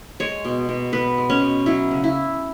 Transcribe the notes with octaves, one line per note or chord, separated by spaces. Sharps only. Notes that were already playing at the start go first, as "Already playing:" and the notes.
G#3 C#5
B2
B2
B3 B4
G#3
C#4
B2
F#3 E4
C#3
E4